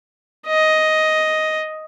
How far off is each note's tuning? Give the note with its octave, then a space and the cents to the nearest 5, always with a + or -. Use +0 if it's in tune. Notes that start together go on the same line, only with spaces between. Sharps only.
D#5 +5